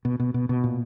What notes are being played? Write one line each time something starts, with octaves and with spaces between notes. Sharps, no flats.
B2
B2
B2
B2
A#2